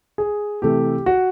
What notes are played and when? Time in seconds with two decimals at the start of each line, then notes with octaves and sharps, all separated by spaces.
0.18 G#4
0.62 C3 E3 A3 G4
1.06 F#4